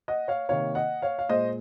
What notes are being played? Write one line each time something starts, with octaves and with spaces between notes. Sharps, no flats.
D#5 F#5
C#5 F5
C3 D#3 A#3 C#5 F5
D#5 F#5
C#5 F5
F5
A#2 G#3 C5 D#5